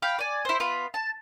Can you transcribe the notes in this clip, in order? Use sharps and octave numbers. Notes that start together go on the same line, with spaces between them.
F5 G5 B5
D5 G#5
E4 C5
B3 F4 B5
A5